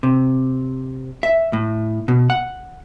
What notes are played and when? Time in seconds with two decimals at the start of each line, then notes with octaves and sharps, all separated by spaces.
0.03 C3
1.23 E5
1.53 A2
2.08 B2
2.30 F#5